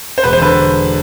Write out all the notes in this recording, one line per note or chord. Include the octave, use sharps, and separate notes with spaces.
C5
E1 B4
C5
D3 B4